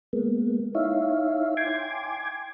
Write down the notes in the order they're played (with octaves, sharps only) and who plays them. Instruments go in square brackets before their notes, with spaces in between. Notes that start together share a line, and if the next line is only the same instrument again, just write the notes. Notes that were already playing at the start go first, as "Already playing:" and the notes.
[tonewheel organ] G#3 A#3 B3
D#4 E4 C#5 E5 F5
G5 G#5 C6 D6 G#6